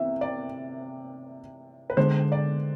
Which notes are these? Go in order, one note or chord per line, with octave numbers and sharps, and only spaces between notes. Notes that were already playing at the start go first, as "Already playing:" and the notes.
Already playing: C3 E3 E5
D5
B4
D3 G#3 C5
D5